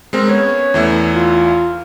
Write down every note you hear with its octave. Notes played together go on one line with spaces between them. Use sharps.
G#3 C4 A#4
B3 C#4 C#5
E2 E3 A3
F4